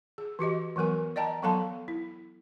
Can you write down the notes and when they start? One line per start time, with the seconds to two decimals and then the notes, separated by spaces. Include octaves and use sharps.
0.18 G#4
0.39 E3 F#4 G4 D#5
0.76 E3 F#3 B3 A#4 G#5
1.16 D5 D#5 G5 A5 A#5
1.42 F#3 B3 A4 F5 A5 C6
1.88 E4